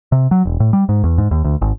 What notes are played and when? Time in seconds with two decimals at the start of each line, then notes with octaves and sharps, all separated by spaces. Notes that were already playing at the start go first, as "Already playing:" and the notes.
0.12 C3
0.31 F#3
0.45 E1
0.60 A2
0.73 G3
0.89 G#2
1.04 E2
1.18 G#2
1.31 D#2
1.44 D2
1.62 G#1